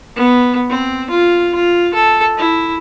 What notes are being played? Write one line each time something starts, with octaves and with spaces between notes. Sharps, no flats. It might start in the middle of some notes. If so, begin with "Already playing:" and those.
B3
C4
F4
F4
A4
E4